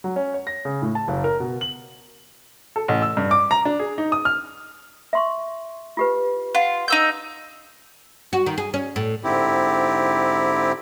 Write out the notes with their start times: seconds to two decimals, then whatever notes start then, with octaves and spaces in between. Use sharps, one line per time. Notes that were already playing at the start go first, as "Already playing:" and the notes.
0.04 F#3
0.16 C#4
0.34 C#5
0.47 A#6
0.65 C#3
0.82 A2
0.95 A5
1.08 F#1
1.24 A#4
1.40 B2
1.61 F#7
2.76 A4
2.88 A1
3.02 E6
3.17 G2
3.31 D6
3.51 A#5
3.65 D4
3.80 G#4
3.98 D#4
4.12 D#6
4.25 F6
5.13 E5 C6 C#6
5.97 F4 G4 B4
6.55 F4 F#5
6.88 D#4 E6 G6
8.33 F#4
8.46 D#3
8.58 G#4
8.74 C#4
8.96 A2
9.24 G#2 D3 C4 E4 G4